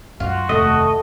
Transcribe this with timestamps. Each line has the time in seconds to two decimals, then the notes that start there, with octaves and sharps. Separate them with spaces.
0.20 F#2 F4 F#4
0.49 F1 D#2 A3 D#5